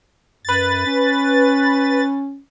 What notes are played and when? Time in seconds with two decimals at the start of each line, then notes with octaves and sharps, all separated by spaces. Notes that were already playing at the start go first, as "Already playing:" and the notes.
0.45 F#2 B4 A6
0.86 C#4